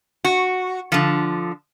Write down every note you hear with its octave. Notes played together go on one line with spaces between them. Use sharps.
F#4
D3 F3